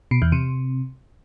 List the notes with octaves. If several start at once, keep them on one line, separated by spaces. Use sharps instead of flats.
B2
E2
C3